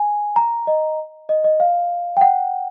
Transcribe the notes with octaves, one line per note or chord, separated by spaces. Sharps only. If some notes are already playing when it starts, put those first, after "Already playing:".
Already playing: G#5
A#5
D#5
D#5
D#5
F5
G5
F#5